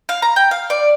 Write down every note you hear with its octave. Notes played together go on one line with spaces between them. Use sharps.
F5
A#5
G5
F5
D5